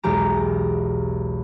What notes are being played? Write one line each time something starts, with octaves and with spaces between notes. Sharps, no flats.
B1 E2 G#3 G4 A#5